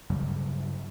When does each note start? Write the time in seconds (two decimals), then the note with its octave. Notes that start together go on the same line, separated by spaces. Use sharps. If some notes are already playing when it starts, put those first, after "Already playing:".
0.10 G2 C#3 F#3 G3